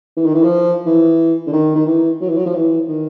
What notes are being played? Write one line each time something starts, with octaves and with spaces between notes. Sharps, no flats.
E3
D#3
E3
F3
E3
D3
D#3
D#3
E3
F#3
E3
F#3
F3
E3
D#3